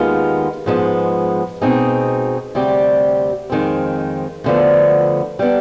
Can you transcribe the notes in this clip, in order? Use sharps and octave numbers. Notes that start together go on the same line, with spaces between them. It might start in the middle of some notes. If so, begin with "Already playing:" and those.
Already playing: D#2 D#3 G#3 B3 F4
G#2 F3 G#3 B3
B2 G#3 C4 D#4 G#4
D2 C3 G3 C4 G4
F2 D#3 G#3 C4
D2 D3 F3 B3
G3 B3 D4